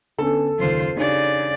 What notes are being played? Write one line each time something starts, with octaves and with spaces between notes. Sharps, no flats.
D3 B3 C#4 A4
F#1 D#2 F4 C5
C#3 D4 D#4 G4 D5